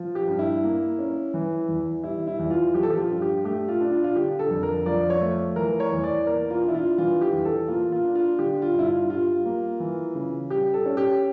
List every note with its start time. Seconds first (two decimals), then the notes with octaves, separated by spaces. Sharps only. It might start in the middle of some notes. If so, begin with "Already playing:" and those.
Already playing: F3
0.15 G4
0.28 G2
0.39 E4
0.63 A#3
0.99 C#4
1.34 E3
1.68 E2
2.03 G3 E4
2.27 E4
2.39 E2
2.50 F4
2.74 F3 G4
2.83 A4
2.90 G4
2.98 F4
3.10 G2
3.22 G4
3.45 A3 G4
3.68 F4
3.80 D4
3.92 F4
4.04 F4
4.16 D3 G4
4.39 A4
4.51 F2
4.63 A#4
4.86 F3 D5
5.10 C#5
5.21 A3
5.56 E3 A#4
5.80 C#5
5.92 E2
6.04 D5
6.27 A#3 A#4
6.50 F4
6.63 D4
6.68 E4
6.74 F4
6.98 E3 F4
7.21 G4
7.32 E2
7.45 A4
7.68 A#3 F4
7.92 F4
8.03 D4
8.15 F4
8.39 D3 G4
8.62 F4
8.74 G2 E4
8.86 F4
9.09 G3 F4
9.45 A#3
9.80 E3
10.15 C#3
10.50 G3 G4
10.74 A4
10.86 C#4
10.97 G4